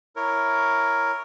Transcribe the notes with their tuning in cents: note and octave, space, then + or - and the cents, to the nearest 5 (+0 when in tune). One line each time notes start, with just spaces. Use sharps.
E4 +0 A#4 +0 C#5 +0